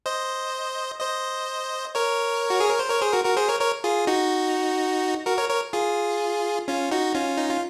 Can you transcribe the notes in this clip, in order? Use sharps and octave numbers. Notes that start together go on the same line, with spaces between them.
C5 D#5
C5 D#5
A#4 C#5
F#4
G#4
A#4
C5
A#4 C#5
G#4 C5
F#4 A#4
F#4 A#4
G#4 C5
A#4 C#5
A#4 C#5
F4 G#4
D#4 F#4
F#4 A#4
A#4 C#5
A#4 C#5
F4 G#4
C#4 F4
D#4 F#4
C#4 F4
D#4
F4